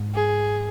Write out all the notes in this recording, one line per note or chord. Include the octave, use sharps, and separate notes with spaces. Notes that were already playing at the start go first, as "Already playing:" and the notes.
Already playing: G#2
G#4